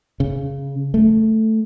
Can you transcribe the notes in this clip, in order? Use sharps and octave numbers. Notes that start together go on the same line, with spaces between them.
C#3
A3